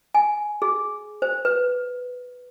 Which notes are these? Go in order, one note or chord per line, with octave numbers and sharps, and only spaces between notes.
G#5
G#4
C5
B4